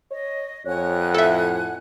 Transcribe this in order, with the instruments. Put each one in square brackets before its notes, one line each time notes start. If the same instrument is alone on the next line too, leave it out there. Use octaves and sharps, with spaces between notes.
[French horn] C#5 [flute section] D#5
[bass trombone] F2 [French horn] C#5 [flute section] F#5 G#5 F#6
[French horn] A2 [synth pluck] A4 E5